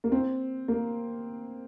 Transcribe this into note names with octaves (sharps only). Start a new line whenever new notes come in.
A#3
C4
A#3